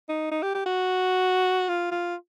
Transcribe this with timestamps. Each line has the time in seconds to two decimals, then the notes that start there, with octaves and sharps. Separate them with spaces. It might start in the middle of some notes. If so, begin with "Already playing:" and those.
0.09 D#4
0.32 D#4
0.43 G4
0.55 G4
0.66 F#4
1.69 F4
1.92 F4